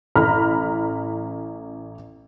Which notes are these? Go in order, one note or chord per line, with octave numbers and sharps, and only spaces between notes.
A1 A#5 B5 F6